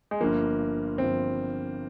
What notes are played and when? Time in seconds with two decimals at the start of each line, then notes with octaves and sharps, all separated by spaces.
0.11 G#3
0.20 G1 G2 F3 A#3
0.98 G1 G2 F3 C4